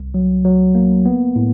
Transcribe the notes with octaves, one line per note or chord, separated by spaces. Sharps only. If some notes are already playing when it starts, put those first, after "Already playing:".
Already playing: C2
F#3
F#3
A#3
B3
A2